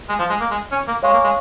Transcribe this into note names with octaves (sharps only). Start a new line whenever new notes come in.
G#3
F3
G#3
A#3
G#3
C#4
A#3
G#3 C#5 F5 G#5 C#6
A#3
G#3